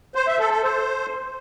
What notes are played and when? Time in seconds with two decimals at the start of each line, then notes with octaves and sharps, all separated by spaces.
0.15 C5
0.27 E5
0.39 A4
0.51 A4
0.63 C5